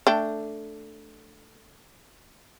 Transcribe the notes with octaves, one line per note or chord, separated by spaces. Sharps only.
A3 D4 G5